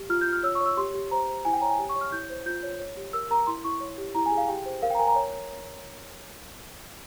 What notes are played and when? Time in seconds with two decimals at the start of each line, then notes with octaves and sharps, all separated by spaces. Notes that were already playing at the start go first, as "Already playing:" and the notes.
Already playing: G4
0.09 F4 F6
0.21 G6
0.27 F4
0.32 F6
0.43 C#5 E6
0.55 C#6
0.60 C#5
0.66 E6
0.77 G4 C6
0.94 G4
1.11 C5 A#5
1.29 C5
1.45 E4 G#5
1.53 G5
1.61 C#5 A#5
1.70 G#5
1.79 G4
1.89 C#6
1.95 C#5
2.01 F6
2.12 E4 G6
2.30 C5
2.46 F4 G6
2.63 C#5
2.80 C#5
2.97 G4
3.13 A#4 E6
3.30 A#4 A#5
3.47 E4 C6
3.64 E4 C#6
3.80 C#5
3.98 G4
4.15 E4 A#5
4.26 G#5
4.32 G#4
4.37 F5
4.48 G4 G5
4.66 C5
4.82 A#4 F5
4.90 G5
4.95 A#5
4.99 A#4 G#5
5.07 A#5
5.15 C#5